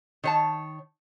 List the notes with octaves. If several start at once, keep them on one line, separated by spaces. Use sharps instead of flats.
D#3 C#5 A5